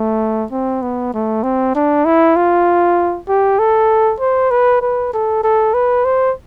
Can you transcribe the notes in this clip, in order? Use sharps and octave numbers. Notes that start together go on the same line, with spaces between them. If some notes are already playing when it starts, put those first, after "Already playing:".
Already playing: A3
C4
B3
A3
C4
D4
E4
F4
G4
A4
C5
B4
B4
A4
A4
B4
C5